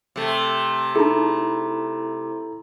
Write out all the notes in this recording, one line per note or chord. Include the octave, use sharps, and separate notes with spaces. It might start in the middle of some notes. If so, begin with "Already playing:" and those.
C3 A3
D#4 E4 G#4 A4 A#5